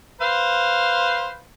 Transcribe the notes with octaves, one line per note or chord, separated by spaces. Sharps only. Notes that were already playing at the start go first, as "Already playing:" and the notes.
B4 C5 F5